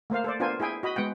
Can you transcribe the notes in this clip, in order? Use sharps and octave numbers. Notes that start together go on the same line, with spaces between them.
A3 A#3 C5 F5
A4 C5 D5
B3 D4 F4 A#4 C5 G#5
E4 G#4 G5 G#5
F#4 D#5 B5
G#3 B3 F#5 G5